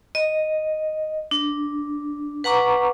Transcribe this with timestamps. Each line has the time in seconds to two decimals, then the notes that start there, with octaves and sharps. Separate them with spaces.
0.15 D#5
1.31 D4
2.44 B4 F#5 A#5 C#6 D6